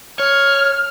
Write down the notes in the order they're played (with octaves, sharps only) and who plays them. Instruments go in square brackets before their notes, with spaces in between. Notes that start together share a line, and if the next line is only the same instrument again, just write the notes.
[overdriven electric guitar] C#5 [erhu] F6